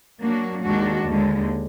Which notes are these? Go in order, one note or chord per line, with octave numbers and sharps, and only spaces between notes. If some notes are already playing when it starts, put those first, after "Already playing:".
F#3 A#3 D4 F#4
D#2 D#3 G#3 D4 F#4
D#2 D3 G#3